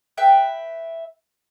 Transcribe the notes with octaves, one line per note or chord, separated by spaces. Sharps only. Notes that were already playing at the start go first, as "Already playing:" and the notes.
B4 E5 G5